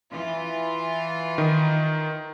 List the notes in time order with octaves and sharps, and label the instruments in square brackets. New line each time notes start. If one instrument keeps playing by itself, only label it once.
[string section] E3 F4
[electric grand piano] D#3